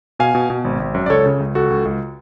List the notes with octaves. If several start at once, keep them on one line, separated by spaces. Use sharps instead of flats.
B2 F5 G#5
B2
B2
G#1
G#1
F#2
D5
C#2 A4 C#5
C#3
C#2
C#2 F#4 A4
C#2
C#2